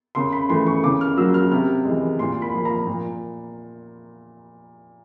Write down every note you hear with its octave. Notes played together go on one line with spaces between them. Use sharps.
C#3 C6
B5
E3 A3 C6
C#6
C#3 D6
F6
F#3 A#3 E6
F6
C3 F6
E3 G#3
A#2 C6
B5
F3 A#3
A#5
A#2